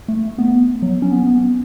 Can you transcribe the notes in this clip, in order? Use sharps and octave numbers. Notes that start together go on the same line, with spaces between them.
A3
B3
F#3
C#4
B3
B3